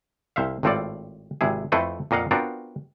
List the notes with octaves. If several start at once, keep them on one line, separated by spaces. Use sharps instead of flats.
C2 C5 E5 F5
G#1 A2 C4 F4 A4 D5
G#1 C3 E4 G#4
F2 A3 E4 A4 B4 C5
F2 A#2 D#5 F5 F#5
B3 C4 D4 F4 F#4 A#4